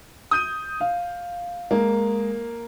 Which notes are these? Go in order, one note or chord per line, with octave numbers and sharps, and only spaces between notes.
D#6 G6 D#7
F5
G#3 A#3